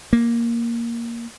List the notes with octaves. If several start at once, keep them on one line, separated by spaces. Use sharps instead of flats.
A#3